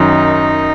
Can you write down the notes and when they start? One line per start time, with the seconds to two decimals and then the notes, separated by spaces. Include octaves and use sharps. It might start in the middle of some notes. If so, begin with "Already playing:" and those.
Already playing: F#2 D#3 D#4